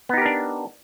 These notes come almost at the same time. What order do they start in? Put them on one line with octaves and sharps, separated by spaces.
B3 D#4 G4 A#4 D4